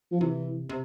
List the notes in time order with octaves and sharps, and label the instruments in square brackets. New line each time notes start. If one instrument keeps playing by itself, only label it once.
[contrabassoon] F3
[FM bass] C3 [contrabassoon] E3
[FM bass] C3